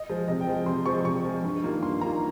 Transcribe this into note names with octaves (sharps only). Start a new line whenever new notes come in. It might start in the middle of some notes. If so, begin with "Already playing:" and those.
Already playing: D#5
F3 G#3
C3 D#5
G5
F3 G#3
C3 C6
F3 G#3 C#6
C3 C#6
F3 G#3
G2
D#3 G3 A#3 F4
G2 C6
D#3 G3 A#3 F4 A#5